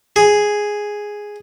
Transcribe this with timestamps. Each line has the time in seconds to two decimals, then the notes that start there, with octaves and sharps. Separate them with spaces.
0.16 G#4